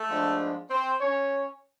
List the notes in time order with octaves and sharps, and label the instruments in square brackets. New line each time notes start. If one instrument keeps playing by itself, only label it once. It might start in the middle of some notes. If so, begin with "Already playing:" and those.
Already playing: [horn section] A3 A4
G#2 F3 G#3 B3 D4
C4 C5
C#4 C#5